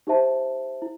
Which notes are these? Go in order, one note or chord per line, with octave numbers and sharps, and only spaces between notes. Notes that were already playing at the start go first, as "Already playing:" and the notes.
D#4 G4 C5 E5 A5
E4